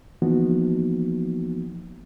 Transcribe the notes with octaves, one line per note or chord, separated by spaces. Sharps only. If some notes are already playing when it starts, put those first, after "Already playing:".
E3 F3 A#3 B3 D#4 F#4